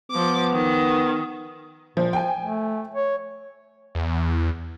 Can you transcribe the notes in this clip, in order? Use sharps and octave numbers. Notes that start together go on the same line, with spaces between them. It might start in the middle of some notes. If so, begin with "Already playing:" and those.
F3 B3 D6
D#3
A#2 F3
F3 G5 G#5
A3
C#5
E2